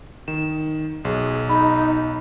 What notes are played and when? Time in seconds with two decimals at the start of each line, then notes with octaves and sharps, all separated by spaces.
0.28 D#3 E7
1.05 B1 G#4
1.49 D#4 D#5 B5